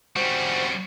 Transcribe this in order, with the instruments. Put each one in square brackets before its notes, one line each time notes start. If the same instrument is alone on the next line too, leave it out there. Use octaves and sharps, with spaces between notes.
[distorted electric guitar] G3 C#4 [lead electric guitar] C4 F#4 [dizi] C5